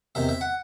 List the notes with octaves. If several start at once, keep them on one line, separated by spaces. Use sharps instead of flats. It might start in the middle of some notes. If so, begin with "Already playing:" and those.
E2 C3 D#3 E5
E5
F#5